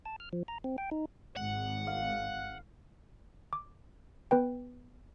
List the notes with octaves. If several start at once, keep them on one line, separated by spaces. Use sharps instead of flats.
A5
F6
F3
A#5
C4
G5
D#4
G#1 F#5
F5
D6
B3 B4 G5